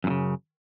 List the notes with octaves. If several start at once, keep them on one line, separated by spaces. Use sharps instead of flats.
F#2 A2 C#3